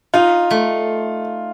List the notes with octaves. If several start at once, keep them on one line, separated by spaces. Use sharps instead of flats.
D#4 F4
A3